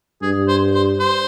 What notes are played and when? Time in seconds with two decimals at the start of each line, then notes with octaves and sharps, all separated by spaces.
0.22 G2 G#4
0.48 C5
0.74 C5
1.00 C5